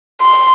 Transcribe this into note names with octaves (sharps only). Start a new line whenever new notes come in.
C6